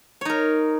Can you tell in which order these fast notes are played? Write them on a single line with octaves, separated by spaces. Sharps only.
C#5 D#4 A#4